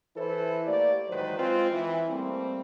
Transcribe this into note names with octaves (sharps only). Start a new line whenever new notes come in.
E3 E4 A4 B4 C5
A3 A#3 G4 D5
G#2 D#3 E3 F#3 B4 C5
G#3 C4 F4
E3
G3 A3 A#3 C4